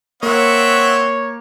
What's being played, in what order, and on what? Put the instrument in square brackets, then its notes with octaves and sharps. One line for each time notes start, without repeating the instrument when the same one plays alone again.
[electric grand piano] A#3 [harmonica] C4 E5 F#5 [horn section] C#5